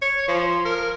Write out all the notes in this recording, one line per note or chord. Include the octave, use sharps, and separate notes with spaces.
C#5
F3
A#4